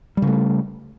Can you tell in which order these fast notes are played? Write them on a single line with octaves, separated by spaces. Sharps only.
G3 C#3 A3